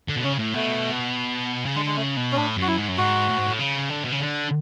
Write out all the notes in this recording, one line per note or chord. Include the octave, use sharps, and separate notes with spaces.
D3
B2
C#3 C#4
A2
B2 A3
C#3
D3 G#3
G#3
C#3 A3
B2
C#4
A2 D4
F#2 F#4
E4
G#2
F#2
G#2 F#4
A2
G#2
A2
C#3
D3
B2
C#3
D3